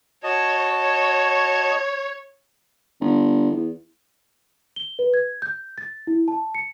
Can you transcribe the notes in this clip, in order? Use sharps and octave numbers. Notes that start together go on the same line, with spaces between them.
F#4 C#5 D#5 A5
C#5
G1
E2
G7
B4
G#6
G6
A6
E4
A5
C#7